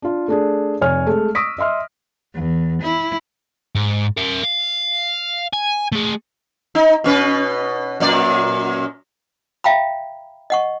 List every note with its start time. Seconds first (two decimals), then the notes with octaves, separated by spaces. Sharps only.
0.02 D4 F4
0.28 A3 D4 G#4
0.81 F1 C#5 G#5 F6
1.07 G#3 A3
1.35 C#6 D#6 E6 A#6 B6 D7
1.58 D#5 E5 C6 F6
2.34 E2
2.83 E4
3.75 G#2
4.17 A#4 E5
4.44 F5
5.53 G#5
5.92 A3 G#4
6.75 D#4
7.04 B2 C#4 B4
8.00 F#2 A#2 D5
9.64 E5 F5 G5 A#5 B5
10.50 D#5 F#5 C#6